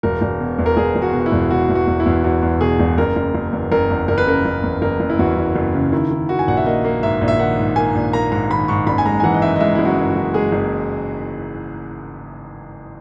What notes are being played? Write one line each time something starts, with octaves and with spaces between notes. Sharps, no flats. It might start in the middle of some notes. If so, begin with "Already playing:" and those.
E1 A#4
E1
B2
E2
A#4
E1 G#4
E1
F#4
B2
F#4
E4
E1
B2 F#4
E2
F#4
E2
E4
E2
E2 F#4
E2
B2 G#4
E1
F#1 A#4
F#1
F#1
E2
F#1 A#4
E2
F#1 A#4
B4
C#3 A#4
F#1
E2
F#1 A#4
F#1
E4
E2 F#4
F#1
F#1
C#3
D#3 E4
D#3
D#3 F#4
G#5
A#1 F#5
E5
A#3 D#5
A#3
G#2 E5
A#1
E5
D#3 F#5
G#2
A#3 G#5
A#1
A#3 A#5
G#2 A#5
D#3 B5
G#2 C#6
F#1 B5
G#5
G#3 A#5
G#5
E3 F#5
D#5
F#2 E5
D#5
G#3 E5
F#1 E4
F#4
F#1
F#4
F#1
G#3 G#4
F#1